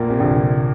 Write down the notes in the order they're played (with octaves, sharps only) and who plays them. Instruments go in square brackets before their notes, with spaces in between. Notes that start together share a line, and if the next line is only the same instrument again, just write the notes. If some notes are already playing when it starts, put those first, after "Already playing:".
Already playing: [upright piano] A#1 A#2 A#3
[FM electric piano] C3
[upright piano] A#1 [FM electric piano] D3